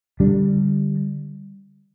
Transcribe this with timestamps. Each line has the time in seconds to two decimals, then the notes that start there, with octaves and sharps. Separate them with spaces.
0.20 D3 G3 D4